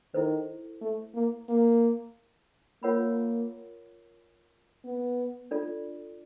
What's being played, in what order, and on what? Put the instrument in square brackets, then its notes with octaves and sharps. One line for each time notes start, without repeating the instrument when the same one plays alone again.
[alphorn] D#3 [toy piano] E4 A4 C5
[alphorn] A3
A#3
A#3
[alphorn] A#3 [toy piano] F4 A#4 C#5 F#5 B5
[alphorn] B3
[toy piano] D4 F4 A4 D5